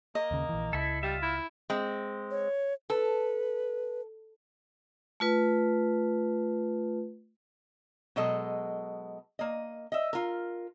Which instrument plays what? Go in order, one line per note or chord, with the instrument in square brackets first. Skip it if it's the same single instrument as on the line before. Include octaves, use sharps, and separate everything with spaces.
[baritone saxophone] A#3 [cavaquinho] D#5
[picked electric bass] D#2 C#3
A#1 E3
[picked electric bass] C#2 [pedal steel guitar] E4 A4
[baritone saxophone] G3 [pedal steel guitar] F4 E5
[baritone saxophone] E4
[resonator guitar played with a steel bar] G#3 C4
[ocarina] C#5
[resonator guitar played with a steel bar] A4 [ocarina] B4
[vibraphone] A3 F4 B4
[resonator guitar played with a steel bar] B2 F#3 G#3 A4 D#5
A#3 D#5
D#5 E5
F4 A#4